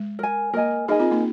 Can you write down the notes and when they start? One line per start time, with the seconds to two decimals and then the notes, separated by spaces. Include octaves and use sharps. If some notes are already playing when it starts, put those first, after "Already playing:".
Already playing: G#3
0.19 A#4 G#5
0.54 A#3 A#4 D#5 G#5
0.88 D#4 G#4 A#4 D#5 G#5
0.99 C4 F4
1.11 A#3 D#4